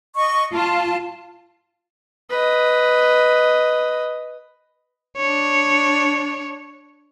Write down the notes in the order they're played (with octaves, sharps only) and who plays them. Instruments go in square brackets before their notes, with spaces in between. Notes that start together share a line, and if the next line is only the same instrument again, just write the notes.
[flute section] D#5 C#6
[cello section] F4 [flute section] A5
[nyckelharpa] B4 D#5
[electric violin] D4 C#5